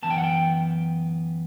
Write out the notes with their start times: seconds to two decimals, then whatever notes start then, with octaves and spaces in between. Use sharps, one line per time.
0.03 F#2 E3 B3 A5
0.10 G5
0.18 F#5
0.24 G5